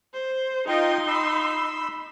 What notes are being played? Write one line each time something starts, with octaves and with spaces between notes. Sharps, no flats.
C5
D#4 F4 D#5 G5 C6
B5 E6